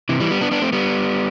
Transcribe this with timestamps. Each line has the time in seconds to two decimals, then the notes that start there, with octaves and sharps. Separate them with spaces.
0.09 C3 E3
0.20 E3 G3
0.31 G3 B3
0.41 B3 D4
0.51 B3 D4
0.62 A3 C4
0.73 G3 B3